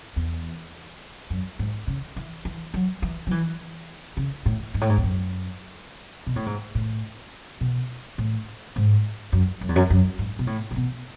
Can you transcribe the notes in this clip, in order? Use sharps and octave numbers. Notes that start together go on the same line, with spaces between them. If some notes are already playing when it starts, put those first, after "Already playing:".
E2
F#2
G#2
C#3
E3
E3
F#3
E3
F#3
E3
C#3
A2
G#2
A2
G#2
E2
F#2
B2
A2
G#2
A2
B2
A2
G#2
F#2
F#2
E2
F#2
F#2
G#2
B2
A2
A2
B2